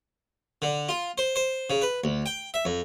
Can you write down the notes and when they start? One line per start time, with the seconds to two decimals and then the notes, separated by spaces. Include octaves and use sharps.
0.62 D3
0.89 F4
1.18 C5
1.36 C5
1.70 C#3
1.82 B4
2.04 D2
2.26 G5
2.54 E5
2.65 F2